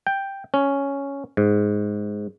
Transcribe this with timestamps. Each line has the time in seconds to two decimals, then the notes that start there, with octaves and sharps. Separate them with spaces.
0.07 G5
0.54 C#4
1.37 G#2